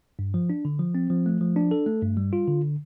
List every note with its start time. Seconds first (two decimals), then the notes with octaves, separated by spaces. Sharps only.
0.19 G2
0.34 F3
0.50 D4
0.65 D3
0.79 F3
0.95 C4
1.10 F3
1.26 A3
1.41 F3
1.56 D4
1.71 A4
1.86 A3
2.02 G2
2.17 G3
2.33 F4
2.48 D3